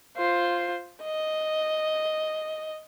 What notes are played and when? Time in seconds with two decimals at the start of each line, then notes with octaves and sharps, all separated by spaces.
0.17 F4 C5
1.02 D#5